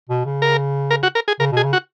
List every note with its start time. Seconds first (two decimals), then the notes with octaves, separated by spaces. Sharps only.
0.09 B2
0.25 C#3
0.42 A#4
0.91 A#4
1.03 F#4
1.15 A#4
1.28 G#4
1.39 C#3 A#4
1.52 B2
1.57 G#4
1.64 C#3
1.73 F#4